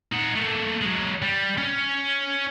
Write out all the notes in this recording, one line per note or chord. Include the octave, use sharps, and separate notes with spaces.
D#4 F#5
A3 A#3
F#3 G#3
G3
C#4